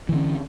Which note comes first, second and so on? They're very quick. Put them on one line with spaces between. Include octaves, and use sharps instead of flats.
E3 D3 C#4